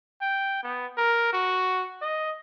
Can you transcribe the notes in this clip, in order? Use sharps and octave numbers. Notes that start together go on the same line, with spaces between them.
G5
B3
A#4
F#4
D#5